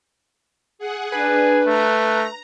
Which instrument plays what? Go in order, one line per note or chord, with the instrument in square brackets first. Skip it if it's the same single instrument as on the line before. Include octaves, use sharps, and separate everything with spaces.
[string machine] G#4 F#5
[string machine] D4 [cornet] G#4 [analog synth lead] B4
[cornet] A3 [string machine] A#5